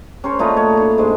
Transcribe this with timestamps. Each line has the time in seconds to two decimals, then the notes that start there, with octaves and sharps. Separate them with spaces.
0.24 C#4 A#4 C5 C#5
0.39 A#2 A3 D#4 B4
0.57 C#5
0.77 D4
0.98 G#2 G#3